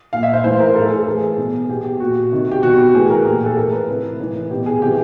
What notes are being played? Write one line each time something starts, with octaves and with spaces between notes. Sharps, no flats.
A#2 F5
E5
C5
A2 E3 C5
A#4
A2 E3 A4
G#4
A4
A2 E3 G#4
B2
G#4
B2 G4
G4
A#2 F#4
C3 D#3
G4
B2 F#4
G4
A2 E3 G#4
A#4
A#2 G4
G#4
A4
A2 E3 A#4
B4
C3 E3
A2 E3
B2 G4
G#4
C3 E3 G4